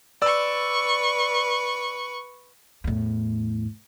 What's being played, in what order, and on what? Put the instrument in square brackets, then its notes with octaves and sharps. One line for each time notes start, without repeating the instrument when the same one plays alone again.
[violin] B4 C#6 [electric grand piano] D5 E6
[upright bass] E2 A2